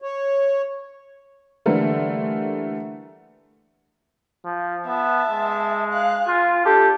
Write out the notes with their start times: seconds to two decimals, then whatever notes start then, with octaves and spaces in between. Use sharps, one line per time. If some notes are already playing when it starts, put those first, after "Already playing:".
0.02 C#5
1.66 D3 E3 G3 A3 A#3
4.45 F3
4.87 B3 E5 A5
5.29 G#3
5.92 F5 F#6
6.27 F4 G#5
6.65 D4 G4 A4